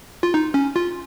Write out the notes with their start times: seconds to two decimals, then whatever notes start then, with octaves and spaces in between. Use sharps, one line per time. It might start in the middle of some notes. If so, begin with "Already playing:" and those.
0.23 F4
0.34 D#4
0.54 C#4
0.76 F4